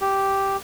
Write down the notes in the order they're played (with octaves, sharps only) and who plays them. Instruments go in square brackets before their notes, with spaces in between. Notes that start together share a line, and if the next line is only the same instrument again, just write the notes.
[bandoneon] G4